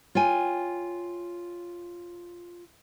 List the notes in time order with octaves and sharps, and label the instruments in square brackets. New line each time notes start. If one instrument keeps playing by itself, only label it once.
[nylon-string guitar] F4 C#5 G5 G#5